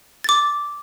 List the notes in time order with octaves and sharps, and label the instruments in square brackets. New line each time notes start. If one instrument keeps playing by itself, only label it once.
[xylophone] D6 A6